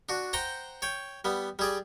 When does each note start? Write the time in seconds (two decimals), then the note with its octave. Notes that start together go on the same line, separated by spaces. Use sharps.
0.09 D4 F#4
0.33 C5 F#5 G5 A#5 C6
0.82 C#5 G5
1.25 G3 B3
1.59 G3 G#4 D5